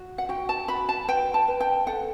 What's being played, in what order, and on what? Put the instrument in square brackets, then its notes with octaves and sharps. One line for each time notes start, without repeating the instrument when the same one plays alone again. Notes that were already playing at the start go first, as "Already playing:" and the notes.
Already playing: [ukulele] F#4
F#5
F#4 G5
A5
F#4 B5
A5
B4 G5
A5
B4
G5
A4 F#5